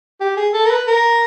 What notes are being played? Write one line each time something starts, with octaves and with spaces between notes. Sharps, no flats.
G4
G#4
A4
A#4
B4
A#4